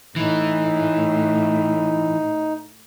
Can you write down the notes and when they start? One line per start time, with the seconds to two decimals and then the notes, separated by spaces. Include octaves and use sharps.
0.16 A2 E3 D#4